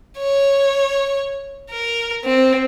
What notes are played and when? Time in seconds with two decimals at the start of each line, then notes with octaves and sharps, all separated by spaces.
0.19 C#5
1.71 A#4
2.25 C4